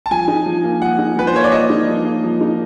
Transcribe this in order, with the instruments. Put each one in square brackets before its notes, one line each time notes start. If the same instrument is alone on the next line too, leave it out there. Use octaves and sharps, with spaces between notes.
[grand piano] A5
[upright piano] F3 [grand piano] G#5
[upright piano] D#4
F3
A#3
[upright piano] F3 [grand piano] F#5
[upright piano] D#4
[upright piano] F3 [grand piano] B4
[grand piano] C5
[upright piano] A#3 [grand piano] C#5
[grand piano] D5
[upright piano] F3 [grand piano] D#5
[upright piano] D#4
F3
A#3
F3
D#4